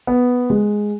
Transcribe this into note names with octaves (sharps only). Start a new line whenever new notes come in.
B3
G#3